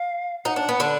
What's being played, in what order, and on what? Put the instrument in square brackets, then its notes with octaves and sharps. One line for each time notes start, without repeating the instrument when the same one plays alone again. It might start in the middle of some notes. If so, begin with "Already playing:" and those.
Already playing: [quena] F5
[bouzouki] D#4 [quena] F#5
[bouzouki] D4
B3
D3 D4